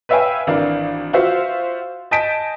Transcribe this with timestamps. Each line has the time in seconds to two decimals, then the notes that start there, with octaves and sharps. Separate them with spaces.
0.09 B4 C#5 E5 F5 G5 G#5
0.47 G#1 E3 D4 A#4 F5
1.13 F4 F#4 C5 E5 F5
2.11 D#5 G#5 A5 G6 B6 D7